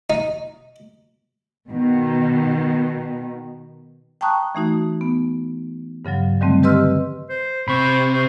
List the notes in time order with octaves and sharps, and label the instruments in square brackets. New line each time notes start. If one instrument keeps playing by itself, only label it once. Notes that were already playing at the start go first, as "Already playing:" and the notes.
[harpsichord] D#4
[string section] B2 D#3
[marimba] G5 A5 A#5 C#6 D#6 F#6
E3 A3 D#4 F#4
B3
G2 C#3 F3 F#3
D3 D#3 G3 A3 C4
G4 B4 D#5 C6 E6 F6
[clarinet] C5
[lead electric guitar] C3 [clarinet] C5 [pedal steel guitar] B5 C#6
[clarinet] C5